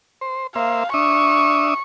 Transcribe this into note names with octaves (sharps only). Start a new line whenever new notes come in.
C5
A#3 C5 E5 F5
D4 E5 C#6 D#6